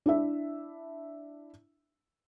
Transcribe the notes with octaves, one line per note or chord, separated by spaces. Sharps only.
D4 E4 E5